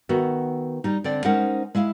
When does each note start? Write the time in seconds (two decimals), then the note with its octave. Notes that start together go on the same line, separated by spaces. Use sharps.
0.09 D#3 B3 F#4 E5
0.84 G3 D#4
1.04 D3 C4 D5
1.25 G#3 C#4 D#4 A#4 C5 F#5
1.75 G#3 E4 E5 F5